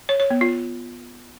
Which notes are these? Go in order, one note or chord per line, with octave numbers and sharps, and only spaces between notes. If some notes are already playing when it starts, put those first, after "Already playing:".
C#5
C#5
B3
F4